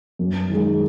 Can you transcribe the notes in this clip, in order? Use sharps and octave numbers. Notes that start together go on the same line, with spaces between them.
F#2
D#3 G#3